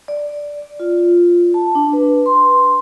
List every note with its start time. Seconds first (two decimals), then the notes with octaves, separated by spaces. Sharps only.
0.08 D5
0.80 F4
1.54 A5
1.75 D4
1.93 B4
2.26 C6